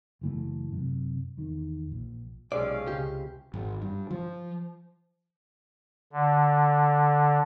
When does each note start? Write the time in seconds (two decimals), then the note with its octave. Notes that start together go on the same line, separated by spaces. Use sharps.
0.21 F#1 E3 A3
0.70 F#2 C3
1.37 E2 D#3
1.91 A#1
2.52 B1 F2 C3 G#3 C#4 D5 F5
2.88 C#2 G4
3.54 G#1
3.82 G2
4.11 F3
6.13 D3